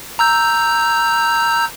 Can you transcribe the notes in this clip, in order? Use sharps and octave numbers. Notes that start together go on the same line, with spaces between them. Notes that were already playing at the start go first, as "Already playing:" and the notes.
A#5 E6 G6